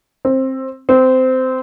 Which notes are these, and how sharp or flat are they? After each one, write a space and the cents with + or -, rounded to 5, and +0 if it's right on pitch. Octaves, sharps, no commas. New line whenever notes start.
C4 +15
C4 -20